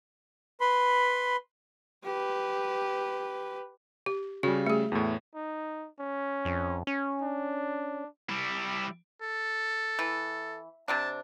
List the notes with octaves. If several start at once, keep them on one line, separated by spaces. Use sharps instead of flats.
B4 B5 C6
G4 B4
G4
C#3 G3 F#4
A3 G#4
E2 A2
D#4
C#4
F2
C#4
D4
G3 E4
A4
E3
C3 C4 D4 A5